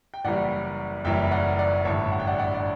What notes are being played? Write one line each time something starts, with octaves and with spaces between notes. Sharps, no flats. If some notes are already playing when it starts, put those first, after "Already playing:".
G5
F#1 F#2 E3 G3 D5 F#5
F#1 F#2 E3 G3 E5 G5
D5 F#5
D5 F#5
A1 G2 D3 C#5 E5
F#5
G5
D5 F#5
D5 F#5
D5